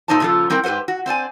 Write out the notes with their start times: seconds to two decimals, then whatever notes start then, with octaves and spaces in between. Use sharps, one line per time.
0.08 A#2 A3 D#4 C5 D5 A5
0.20 A#2 C#3 F3 F4 A4
0.50 G3 C4 E4 A#4 G5
0.63 G#2 G4 B4 C5 F#5
0.88 F#4
1.06 C4 C5 D5 G#5